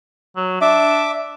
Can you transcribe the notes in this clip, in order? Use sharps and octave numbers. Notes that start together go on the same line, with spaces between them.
F#3
D4 E5 D6